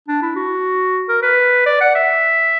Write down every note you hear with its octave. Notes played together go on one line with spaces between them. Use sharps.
D4
E4
F#4
A#4
B4
D5
F#5
E5